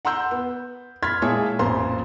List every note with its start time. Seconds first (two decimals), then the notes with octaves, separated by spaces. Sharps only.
0.05 F#5 A#5 C6 E6 G6
0.31 B3
1.03 B5 C6 F6 G#6 A6 B6
1.22 A#2 G#3 E4 G#4 C#5 A5
1.59 A1 F2 A#2 C5 A#5 C6